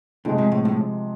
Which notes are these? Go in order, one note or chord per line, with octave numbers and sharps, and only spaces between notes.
F2 C3 F3 G#3
G#2
A2
A2